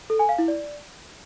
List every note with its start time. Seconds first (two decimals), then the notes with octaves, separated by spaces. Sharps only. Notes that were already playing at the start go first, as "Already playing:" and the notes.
0.10 A4
0.19 G#5
0.29 F5
0.38 E4
0.48 D5